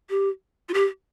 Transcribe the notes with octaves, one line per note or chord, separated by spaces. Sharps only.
G4
F4
G4